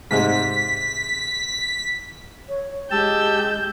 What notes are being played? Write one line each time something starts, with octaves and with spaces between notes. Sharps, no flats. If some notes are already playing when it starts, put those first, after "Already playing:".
G#2 C3 G#3 B6
C#5
G#3 G4 A5 E6 G6